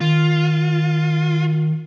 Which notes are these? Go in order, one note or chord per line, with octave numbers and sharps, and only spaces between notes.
D#3 F4